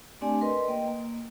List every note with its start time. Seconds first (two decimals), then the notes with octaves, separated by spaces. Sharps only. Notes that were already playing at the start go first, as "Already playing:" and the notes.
0.21 A3 C4 D4 G4 D5 G#5
0.41 A#4 B4 D#5 C6
0.68 A#3 D#5 G5
0.88 A#3